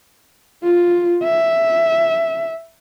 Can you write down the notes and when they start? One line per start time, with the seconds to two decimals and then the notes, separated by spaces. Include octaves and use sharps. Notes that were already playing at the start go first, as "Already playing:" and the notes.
0.63 F4
1.24 E5